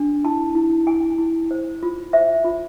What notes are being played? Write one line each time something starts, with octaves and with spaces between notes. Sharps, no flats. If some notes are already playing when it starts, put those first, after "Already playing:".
Already playing: D4
E4 A5
E4
E4 G#5
E4
C5
F4
C5 E5
F4